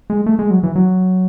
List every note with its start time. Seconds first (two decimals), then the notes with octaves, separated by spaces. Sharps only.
0.10 G#3
0.26 A3
0.39 G#3
0.51 F#3
0.63 E3
0.76 F#3